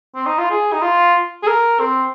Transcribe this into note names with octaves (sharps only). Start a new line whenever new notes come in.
C4
D#4
F4
G#4
D#4
F4
G#4
A#4
C4